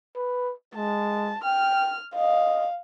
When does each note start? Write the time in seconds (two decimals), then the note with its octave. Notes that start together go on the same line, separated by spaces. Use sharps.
0.16 B4
0.75 G#3 A5
1.44 G5 F6
2.15 D#5 F5